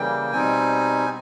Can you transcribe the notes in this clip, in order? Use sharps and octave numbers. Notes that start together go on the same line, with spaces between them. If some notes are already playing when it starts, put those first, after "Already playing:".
Already playing: C#3 E3 G3 A#3 G5
B2 G3 C4 D#4 G#5